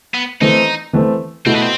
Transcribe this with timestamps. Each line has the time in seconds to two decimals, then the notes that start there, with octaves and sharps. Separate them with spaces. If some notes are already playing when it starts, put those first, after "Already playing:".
0.14 B3
0.41 E3 A3 C4 D#4
0.93 E3 A3 C4
1.46 B2 A3 C4 E4
1.55 B3
1.62 C4